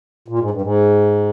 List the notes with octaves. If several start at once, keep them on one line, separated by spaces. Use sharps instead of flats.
A#2
G#2
G2
G#2